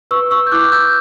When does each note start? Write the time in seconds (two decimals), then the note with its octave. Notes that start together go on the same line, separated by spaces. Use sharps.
0.11 B4 C#6 E6
0.31 C#6 E6
0.47 G6
0.51 E4 D6 F#6
0.72 E6 G6